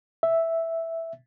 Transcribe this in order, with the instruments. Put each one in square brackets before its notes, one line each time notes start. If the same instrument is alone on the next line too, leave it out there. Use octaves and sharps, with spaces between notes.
[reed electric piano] E5